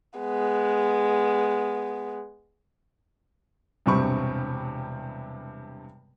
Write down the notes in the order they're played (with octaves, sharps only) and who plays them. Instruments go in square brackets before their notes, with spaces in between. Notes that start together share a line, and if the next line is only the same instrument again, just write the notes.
[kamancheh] G#3 B3
[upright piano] E1 G2 C3 C4 B5 C#6